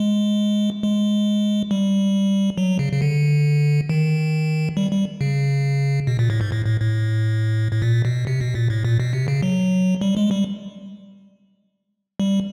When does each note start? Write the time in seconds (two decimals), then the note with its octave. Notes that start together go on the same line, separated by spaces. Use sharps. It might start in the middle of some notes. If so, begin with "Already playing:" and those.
Already playing: G#3
0.83 G#3
1.71 G3
2.58 F#3
2.79 C#3
2.93 C#3
3.02 D3
3.89 D#3
4.77 G3
4.91 G3
5.21 C#3
6.07 B2
6.19 A#2
6.30 A2
6.41 G#2
6.52 A2
6.66 A2
6.81 A2
7.72 A2
7.82 A#2
8.05 B2
8.27 C3
8.41 B2
8.55 A#2
8.70 A2
8.85 A#2
9.00 B2
9.13 C3
9.28 C#3
9.42 F#3
10.01 G3
10.17 G#3
10.31 G3
12.20 G3